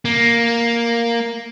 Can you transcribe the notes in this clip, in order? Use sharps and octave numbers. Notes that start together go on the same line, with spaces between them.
A#3